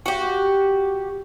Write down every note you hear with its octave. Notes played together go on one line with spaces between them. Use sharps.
F#4 G4